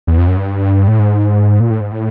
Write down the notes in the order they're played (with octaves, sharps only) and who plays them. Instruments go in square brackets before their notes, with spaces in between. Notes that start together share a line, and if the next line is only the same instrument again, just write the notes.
[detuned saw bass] E2
F2
F#2
G2
A2
G#2
A#2
A2
G#2
A2